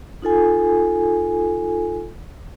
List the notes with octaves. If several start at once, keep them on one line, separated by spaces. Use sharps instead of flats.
D#4 F4 A4 G#5